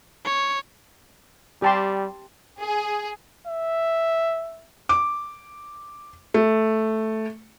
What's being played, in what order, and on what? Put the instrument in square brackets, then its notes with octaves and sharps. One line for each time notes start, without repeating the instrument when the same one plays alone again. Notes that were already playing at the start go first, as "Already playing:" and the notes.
[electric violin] C#5
[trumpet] G3 [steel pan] G4 A5 C6
[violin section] G#4
[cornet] E5
[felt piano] D6
A3